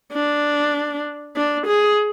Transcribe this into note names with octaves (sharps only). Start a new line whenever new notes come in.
D4
D4
G#4